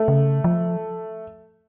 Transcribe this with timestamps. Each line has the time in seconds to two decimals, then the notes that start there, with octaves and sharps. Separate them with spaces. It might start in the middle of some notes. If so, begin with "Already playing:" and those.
Already playing: A3
0.08 C#3
0.44 F3